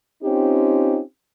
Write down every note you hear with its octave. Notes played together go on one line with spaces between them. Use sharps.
C4 C#4 D#4 F4 G4